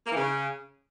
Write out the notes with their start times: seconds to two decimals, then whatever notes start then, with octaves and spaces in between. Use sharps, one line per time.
0.06 A#3
0.12 E3
0.17 C#3